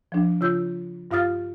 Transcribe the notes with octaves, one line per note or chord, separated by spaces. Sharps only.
F3 D4
C#3 F4 E6 G6
G2 F4 F5 D#6 F6 A6